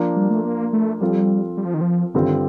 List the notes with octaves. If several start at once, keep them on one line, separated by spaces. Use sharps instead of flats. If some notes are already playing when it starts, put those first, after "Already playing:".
Already playing: F3 A#3 D4 F4
G3
A3
A#3
A3
F3 G3 C4 F4 A4
G3
F3
D#3
F3
G2 D3 D#3 G3 C4 F4